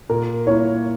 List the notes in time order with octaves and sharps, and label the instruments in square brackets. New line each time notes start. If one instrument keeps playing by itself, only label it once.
[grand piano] A#2 [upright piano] A#4
[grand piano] A#3 E4 [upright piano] C#5